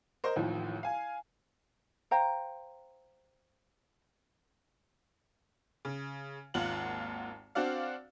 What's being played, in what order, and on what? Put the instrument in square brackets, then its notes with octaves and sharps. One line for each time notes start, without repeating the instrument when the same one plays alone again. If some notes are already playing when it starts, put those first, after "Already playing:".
[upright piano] A#4 C5 D#5
A1 D#2 A2 F3
F5 G#5
[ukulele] C5 F5 G5 A#5
[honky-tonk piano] C#3
G#1 D#2 F4 F#5 F#7
C4 D4 F#4 D5 F5